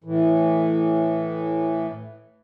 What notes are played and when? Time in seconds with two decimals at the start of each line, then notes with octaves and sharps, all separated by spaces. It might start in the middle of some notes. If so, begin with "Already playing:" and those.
0.04 A2 E3